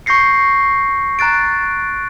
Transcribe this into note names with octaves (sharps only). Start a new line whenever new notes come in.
C#6 G6 A#6 C7 C#7
A#5 F#6 A6 D7